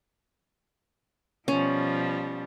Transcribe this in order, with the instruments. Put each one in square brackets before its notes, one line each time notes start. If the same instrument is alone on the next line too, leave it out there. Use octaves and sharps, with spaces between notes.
[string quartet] B2 F3 G3 [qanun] C#4